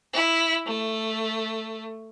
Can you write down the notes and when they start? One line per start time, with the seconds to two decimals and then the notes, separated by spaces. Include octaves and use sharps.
0.13 E4
0.66 A3